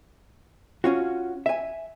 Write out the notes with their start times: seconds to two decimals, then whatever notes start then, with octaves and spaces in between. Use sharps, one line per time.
0.84 C#4 F4 F#4
1.46 E5 G#5